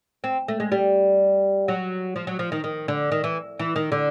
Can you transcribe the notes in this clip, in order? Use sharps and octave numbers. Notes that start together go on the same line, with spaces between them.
C4
A3
G#3
G3
F#3
F3
F#3
F3
D#3
D#3
D3
D#3
E3
E3
D#3
D3